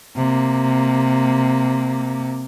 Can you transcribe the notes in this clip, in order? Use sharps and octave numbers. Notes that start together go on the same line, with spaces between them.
C3 A#3